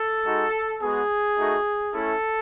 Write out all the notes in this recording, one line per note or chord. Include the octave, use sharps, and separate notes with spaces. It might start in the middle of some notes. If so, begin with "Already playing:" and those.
Already playing: A4
G#3 D#4 F#4
G#3 B3 F#4 G#4
A3 D#4 F#4
A3 C#4 E4 A4